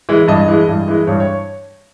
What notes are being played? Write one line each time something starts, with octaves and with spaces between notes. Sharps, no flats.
E3 G#3
G2 D#5
E3 G#3
G2
E3 G#3
G2 C#5
C#5